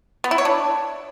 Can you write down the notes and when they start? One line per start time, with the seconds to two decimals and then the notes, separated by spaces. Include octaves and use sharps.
0.24 B3
0.31 E4
0.38 C#5
0.45 D4